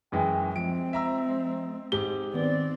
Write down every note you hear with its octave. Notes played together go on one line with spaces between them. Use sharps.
F#2 E3 G#3 G5
F3 G#3 C4 D7
E5 A#5 E6
G#2 G4 G7
D#3 B3 C4 D5